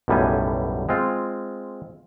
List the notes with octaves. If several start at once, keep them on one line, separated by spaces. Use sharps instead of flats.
B1 F#2 A2 G3 B3 G#5
G#3 C4 F4